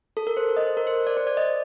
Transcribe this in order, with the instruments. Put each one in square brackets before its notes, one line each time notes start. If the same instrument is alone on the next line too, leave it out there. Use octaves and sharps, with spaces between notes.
[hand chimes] A4
A#4
C5
D#5
C5
A#4
C5
D5
C5
D5
D#5